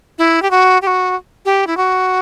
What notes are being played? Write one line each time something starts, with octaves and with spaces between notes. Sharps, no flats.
E4
G4
F#4
G4
F#4
G4
E4
F#4